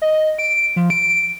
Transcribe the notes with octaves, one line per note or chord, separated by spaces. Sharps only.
D#5
D7
F3
D7